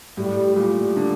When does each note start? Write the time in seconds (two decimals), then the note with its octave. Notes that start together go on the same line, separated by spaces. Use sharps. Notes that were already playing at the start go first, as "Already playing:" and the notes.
0.17 A2 G3
0.56 A#2 G3
0.96 D3